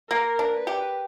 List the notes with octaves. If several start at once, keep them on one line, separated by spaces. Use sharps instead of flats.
A#3 A#4
D4
B4
G4